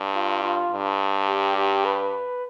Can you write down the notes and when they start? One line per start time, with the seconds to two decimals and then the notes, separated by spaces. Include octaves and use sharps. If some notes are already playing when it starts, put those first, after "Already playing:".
Already playing: G2
0.14 F4
0.43 F4
0.72 G2
1.28 G4
1.57 G4
1.85 B4